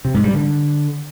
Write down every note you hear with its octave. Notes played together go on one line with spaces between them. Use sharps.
C3
G#2
G3
D3